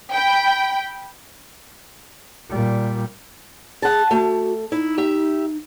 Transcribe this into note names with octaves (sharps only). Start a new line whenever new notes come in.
G5 B5
A#2 G3
G#4 F#5 A5
A3 F#4
D#4 E4
G4 E5